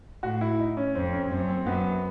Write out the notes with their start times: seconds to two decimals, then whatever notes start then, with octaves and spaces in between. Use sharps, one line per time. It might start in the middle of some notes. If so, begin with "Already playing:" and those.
0.23 A2 F#4
0.41 E4
0.59 D#4
0.77 C#4
0.95 F2 C4
1.12 C#4
1.31 F#2 C4
1.49 C4
1.67 F#2 B3